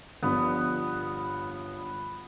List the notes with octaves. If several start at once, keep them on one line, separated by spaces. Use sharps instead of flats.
G1 G2 F3 B3